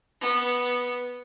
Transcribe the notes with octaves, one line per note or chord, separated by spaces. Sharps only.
B3